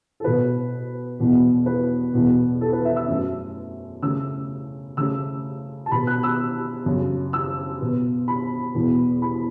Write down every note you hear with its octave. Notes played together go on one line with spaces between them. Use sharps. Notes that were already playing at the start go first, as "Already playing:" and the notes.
A4
B2 B3 B4
E2 B2 B3
B4
E2 B2 B3
A4
B4
E5
E6
F#2 F#3 A3 C#4
C#3 A3 C#4 E6
C#3 A3 C#4 E6
A5
B2 B3 B5
F#6
E6
F#2 C#3 F#3 C#4
E6
B2 B3
B5
E2 B2 B3
B5